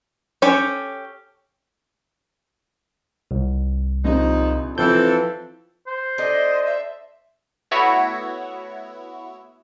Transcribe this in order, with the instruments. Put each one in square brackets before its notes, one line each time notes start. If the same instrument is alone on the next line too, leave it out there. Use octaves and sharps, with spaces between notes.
[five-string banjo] C#4 G4 A4 C#5
[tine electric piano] C2
[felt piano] A#1 C3 [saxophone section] F3 D#4
[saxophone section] E3 C4 [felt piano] F3 F4 [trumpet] A4 [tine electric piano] G6
[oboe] C5
[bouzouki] D4 A4 [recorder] D#5
[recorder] E5
[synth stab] A3 B3 E4 F#4 C#5 E5